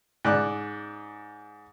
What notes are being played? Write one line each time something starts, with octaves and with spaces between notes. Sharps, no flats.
G#2 D5 F#6